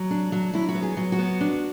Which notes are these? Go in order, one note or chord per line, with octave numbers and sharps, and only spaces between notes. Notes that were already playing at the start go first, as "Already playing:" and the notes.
Already playing: F#3
D4
F#3
F#3 E4
F#4
B3
G#4
F#3
F#4
B3
D4